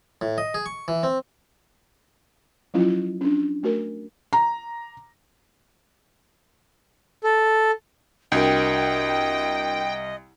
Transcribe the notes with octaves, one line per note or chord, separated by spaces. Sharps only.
A2
D#5
G#4
C#6
E3
C4
F3 F#3 C#4 E4 F4
C#4 D4
A3 F#4 A#4
A#5
A4
C2 D4 F#4 A#4 D#5 G5